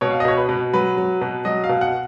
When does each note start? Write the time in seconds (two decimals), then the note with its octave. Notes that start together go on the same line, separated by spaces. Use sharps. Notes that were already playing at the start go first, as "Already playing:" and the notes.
0.01 B2 C#5
0.11 F5
0.20 D#5
0.25 B2 C#5
0.37 B4
0.49 B2
0.73 F#3 B4
0.97 F#3
1.21 B2
1.45 F#3 D#5
1.64 F5
1.69 B2
1.81 F#5